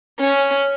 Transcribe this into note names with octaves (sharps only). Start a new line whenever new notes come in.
C#4